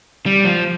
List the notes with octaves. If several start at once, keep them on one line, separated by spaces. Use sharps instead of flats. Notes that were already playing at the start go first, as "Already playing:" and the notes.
G3
F3